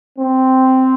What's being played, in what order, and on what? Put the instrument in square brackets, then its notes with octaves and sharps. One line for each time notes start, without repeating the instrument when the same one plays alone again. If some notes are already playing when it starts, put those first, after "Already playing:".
[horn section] C4